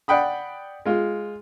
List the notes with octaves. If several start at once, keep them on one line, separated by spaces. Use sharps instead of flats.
D5 F#5 G5 B5 D#6
G#3 F4